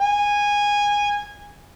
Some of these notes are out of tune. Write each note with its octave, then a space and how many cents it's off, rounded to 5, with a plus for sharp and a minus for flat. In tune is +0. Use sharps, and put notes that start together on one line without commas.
G#5 -15